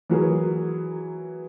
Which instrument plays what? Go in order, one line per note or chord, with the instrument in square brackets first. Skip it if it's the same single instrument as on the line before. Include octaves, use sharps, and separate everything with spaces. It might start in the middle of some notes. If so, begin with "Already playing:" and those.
[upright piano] E3 F#3 G#4 A#4